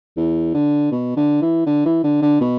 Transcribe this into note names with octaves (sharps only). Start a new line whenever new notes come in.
E2
D3
B2
D3
E3
D3
E3
D3
D3
B2